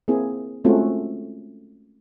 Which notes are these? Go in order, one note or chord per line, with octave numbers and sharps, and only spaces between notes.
A#3 C4 E4 G#4
G#3 A3 C4 C#4 F4 F#4